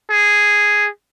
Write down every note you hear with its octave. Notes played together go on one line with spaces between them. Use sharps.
G#4